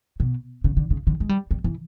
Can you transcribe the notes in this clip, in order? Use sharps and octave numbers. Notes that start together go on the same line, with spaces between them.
B2
C#3
D3
C#3
D3
G#3
G3
G3
E3